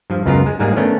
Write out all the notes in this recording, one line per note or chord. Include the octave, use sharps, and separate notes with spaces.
G2 F3
C#2 F#2 B3 F4 G#4 A#4
G#3
G#2 G3 G#3 A#3 G#4
D#3 A3 B3 C#4 D4